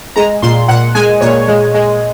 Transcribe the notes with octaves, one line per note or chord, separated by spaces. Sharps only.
G#3 A#5
A#2 C6
A#2 F#5
G#3 G#5
A#2 C#5
G#3
G#3